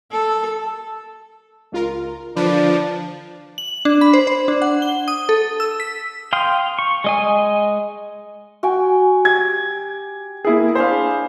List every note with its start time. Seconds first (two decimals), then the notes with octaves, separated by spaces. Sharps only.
0.12 A4
1.72 C#2 F4 A#4
2.36 D3 F3 D4 B4
3.58 F#7
3.85 D4
4.01 B5
4.13 C5
4.27 C5
4.48 D4
4.62 F#5
4.82 G7
5.08 D#6
5.29 A4
5.60 E6
5.80 B6
6.33 F5 G5 C6 D#6
6.79 C#6
7.04 G#3 D#5 G#5
8.63 F#4 G5 G#5
9.25 G4 G#6
10.45 A#3 E4 G#4
10.75 D4 G#4 C5 F5 B5